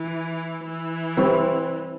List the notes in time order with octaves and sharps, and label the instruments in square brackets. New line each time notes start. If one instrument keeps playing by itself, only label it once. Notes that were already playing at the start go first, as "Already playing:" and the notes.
Already playing: [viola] E3
E3
[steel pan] G3 C4 E4 B4